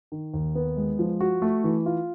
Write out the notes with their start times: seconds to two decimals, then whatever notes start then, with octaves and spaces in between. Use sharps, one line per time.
0.12 D#3
0.34 D#2
0.55 B3
0.77 G#3
0.99 F3
1.20 F#4
1.42 A3
1.64 E3
1.86 F4